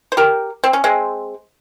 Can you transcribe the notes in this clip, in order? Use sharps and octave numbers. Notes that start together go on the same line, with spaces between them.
C5
G4 A#4
C4
C#4
G#3 C4